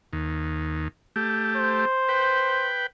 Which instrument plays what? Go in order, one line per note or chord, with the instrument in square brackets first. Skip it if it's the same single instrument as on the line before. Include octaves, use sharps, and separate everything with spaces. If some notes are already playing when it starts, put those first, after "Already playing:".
[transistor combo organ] D#2
A3 G4
[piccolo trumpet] C5
[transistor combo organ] B4 G5